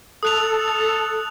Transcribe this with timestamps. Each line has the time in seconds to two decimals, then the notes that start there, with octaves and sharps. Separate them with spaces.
0.23 A4 D#6 F#6 F7